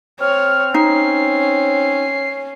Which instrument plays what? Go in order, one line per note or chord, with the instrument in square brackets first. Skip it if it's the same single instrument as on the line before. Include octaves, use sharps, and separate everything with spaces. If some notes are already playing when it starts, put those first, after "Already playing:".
[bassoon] C4 [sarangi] C#5 [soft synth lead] F6
[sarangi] C#4 [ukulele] D#4 [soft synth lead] C7